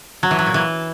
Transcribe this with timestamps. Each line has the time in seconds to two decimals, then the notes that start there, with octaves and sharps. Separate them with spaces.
0.23 F#3
0.31 E3
0.39 F#3
0.46 A#2
0.54 E3